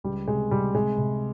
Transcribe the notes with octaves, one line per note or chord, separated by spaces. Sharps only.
C#2 G3
C3 G#3
C3 G3
C3 G#3
C3